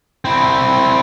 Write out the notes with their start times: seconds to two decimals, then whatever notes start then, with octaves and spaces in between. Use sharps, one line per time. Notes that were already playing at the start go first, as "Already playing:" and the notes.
0.25 C4 E4